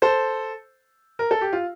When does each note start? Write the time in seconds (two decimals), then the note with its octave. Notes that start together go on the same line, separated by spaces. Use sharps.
0.02 A4 C5
1.19 A#4
1.31 A4
1.41 G4
1.53 F4